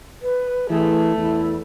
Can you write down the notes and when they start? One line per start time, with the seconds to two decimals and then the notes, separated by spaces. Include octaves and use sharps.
0.22 B4
0.70 E3 A3 G#4
1.17 E2 E4